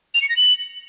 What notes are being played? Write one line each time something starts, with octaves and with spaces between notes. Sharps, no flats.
F7
C#7
A#6
F#7